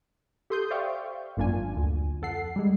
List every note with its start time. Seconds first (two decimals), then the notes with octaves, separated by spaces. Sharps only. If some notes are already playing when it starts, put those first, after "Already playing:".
0.50 G4 A4 C6 D#6 G6
0.70 C5 D5 E5 F5 G5 C#6
1.37 G#1 F#2 A#3 D4 F4 G#5
1.77 D2
2.22 F2 A4 F#5 C7
2.56 G3 G#3